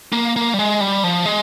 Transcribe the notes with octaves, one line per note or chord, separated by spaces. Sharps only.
A#3
A#3
G3
G#3
G3
F3
G#3